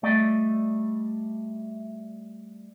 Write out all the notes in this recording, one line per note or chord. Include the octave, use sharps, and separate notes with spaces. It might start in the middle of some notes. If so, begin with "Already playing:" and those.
G3 A3 D5 D#5